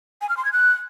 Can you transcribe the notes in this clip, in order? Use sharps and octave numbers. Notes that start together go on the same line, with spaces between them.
G#5
F6
C6
G#6
F#6